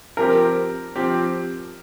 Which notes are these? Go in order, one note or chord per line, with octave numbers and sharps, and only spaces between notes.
F3 C4 G4 A#4
F3 C4 G4